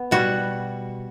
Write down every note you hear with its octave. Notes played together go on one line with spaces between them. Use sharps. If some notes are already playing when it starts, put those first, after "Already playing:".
Already playing: B3
B2 G3 F#4